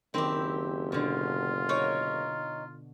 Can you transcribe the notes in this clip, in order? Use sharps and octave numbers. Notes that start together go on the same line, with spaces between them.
F#1 D#3 C4 E4 G4
B2 D3 F4
D#4 A#4 C#5